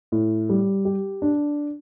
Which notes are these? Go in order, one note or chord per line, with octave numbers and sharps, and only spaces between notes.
A2
G3
G4
D4